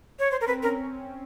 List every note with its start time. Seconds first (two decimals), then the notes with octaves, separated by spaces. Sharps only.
0.19 C#5
0.31 C5
0.41 A#4
0.47 C4 B4
0.63 C#4 A#4